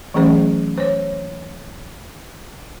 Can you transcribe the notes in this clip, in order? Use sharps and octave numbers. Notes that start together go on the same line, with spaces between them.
E3 F#3 A3 C#4 G#4 C5
C5 C#5